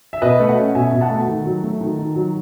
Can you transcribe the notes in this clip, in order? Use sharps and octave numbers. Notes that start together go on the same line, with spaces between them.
E5
B2 B4 D#5
A3
D#5 F#5
C#4
B2 E5 G#5
B2
F#5 A5
A3
D#3
F#3
A3
D#3
D#3
F#3